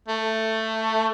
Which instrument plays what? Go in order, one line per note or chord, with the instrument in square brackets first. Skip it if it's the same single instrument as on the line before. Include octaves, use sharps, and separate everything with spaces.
[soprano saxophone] A3